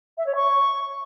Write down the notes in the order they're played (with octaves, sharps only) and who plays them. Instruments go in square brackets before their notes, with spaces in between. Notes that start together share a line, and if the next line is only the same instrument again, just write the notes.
[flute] E5
C#5
C#6